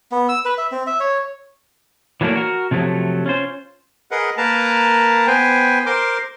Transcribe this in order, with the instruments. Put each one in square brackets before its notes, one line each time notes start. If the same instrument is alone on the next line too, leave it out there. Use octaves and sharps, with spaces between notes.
[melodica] B3
E6
B4
E5
C4
E5
C#5
[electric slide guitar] E3 F#3 A3 A#3 D4
F#4 A#4
C3 F3 F#3 A3
C#4 F4 C5
[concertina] G#4 A#4 B4 D#5 F#5
A#3 A#4 B4 A5 A#5
B3 B4 C5 G5 G#5
A#4 C5 C6 D6